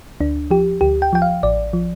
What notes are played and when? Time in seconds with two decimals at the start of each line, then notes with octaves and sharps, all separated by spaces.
0.20 D2 D4
0.51 F3 G4
0.81 D2 G4
1.02 G5
1.13 F3 G5
1.22 F5
1.43 A1 D5
1.73 F3